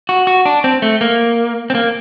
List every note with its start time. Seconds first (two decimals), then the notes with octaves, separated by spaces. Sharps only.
0.09 F#4
0.27 F#4
0.45 D4
0.64 C4
0.82 A3
1.01 A#3
1.70 C4
1.75 A#3